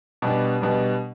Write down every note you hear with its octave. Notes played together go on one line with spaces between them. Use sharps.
B2 G3 B3 D4
B2 G3 B3 D4